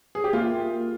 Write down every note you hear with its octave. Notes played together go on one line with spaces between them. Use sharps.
G#4
G4
A#3 F4